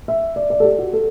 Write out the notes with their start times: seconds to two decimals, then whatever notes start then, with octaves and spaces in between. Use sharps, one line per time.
0.08 E5
0.36 D5
0.50 D5
0.60 A4
0.64 G4
0.79 F#4
0.93 A4